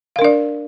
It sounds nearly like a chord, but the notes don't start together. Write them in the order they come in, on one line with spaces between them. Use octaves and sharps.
F5 A#4 D4 D5